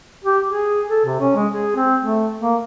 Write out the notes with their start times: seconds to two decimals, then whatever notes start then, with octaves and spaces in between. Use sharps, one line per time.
0.24 G4
0.49 G#4
0.90 A4
1.05 C3
1.20 C#4
1.36 G#3
1.52 G#4
1.76 C4
2.02 A3
2.41 A#3